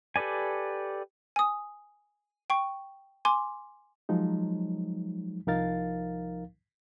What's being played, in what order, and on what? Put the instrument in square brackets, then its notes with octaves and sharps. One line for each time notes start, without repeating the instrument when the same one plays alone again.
[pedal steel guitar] G4 A4 B4 D5 G#5
[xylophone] G#5 D#6
G5 C#6
G#5 C6 D6
[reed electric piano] F3 F#3 G#3 D#4
C2 F3 D#4 A#4 F5 A6